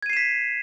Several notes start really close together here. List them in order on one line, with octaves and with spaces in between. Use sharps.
G#6 D#7 C7 E7 B6